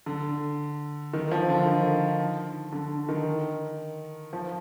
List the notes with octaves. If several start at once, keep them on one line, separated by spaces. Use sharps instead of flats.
D3
D#3
F3
D3
D#3
D3
D#3
F3